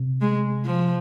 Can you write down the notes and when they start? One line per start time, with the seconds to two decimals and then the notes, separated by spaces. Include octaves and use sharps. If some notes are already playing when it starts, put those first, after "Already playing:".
Already playing: C3
0.21 G#3
0.65 F3